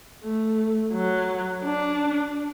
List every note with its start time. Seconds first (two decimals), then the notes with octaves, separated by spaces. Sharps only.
0.24 A3
0.94 F#3
1.64 D4